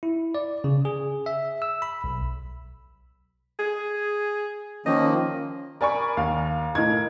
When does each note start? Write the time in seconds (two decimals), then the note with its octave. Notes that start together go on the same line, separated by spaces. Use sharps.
0.03 E4
0.35 D5
0.64 C#3
0.85 G#4
1.26 E5
1.62 E6
1.82 B5
2.04 B1
3.59 G#4
4.86 D#3 F3 A#3 C#4 D#5
5.81 A#4 D5 G#5 B5 C#6
6.17 D#2 F5
6.75 A2 A#4 D#5 G#6